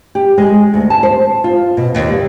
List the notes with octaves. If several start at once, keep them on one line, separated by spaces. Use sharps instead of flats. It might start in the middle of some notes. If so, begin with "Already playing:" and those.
G4
G#3
D2
A5
C5
F4
B2
D#2
G3